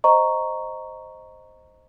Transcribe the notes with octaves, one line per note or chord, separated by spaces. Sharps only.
C5 D#5 A#5 C#6